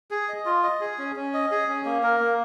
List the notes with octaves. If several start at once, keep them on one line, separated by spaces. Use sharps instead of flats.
G#4
D#5
F4
D#5
G#4
C#4
C#4
D#5
G#4
C#4
A#3
A#4
A#3